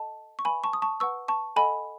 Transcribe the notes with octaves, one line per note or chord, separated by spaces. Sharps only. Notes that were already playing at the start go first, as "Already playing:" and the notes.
Already playing: A4 D#5 F#5 A5
C#6
B4 E5 G#5 B5
A5 C#6
D#6
A5 C#6
B4 F#5 C#6 E6
A5 C#6
A4 D#5 F#5 G#5 B5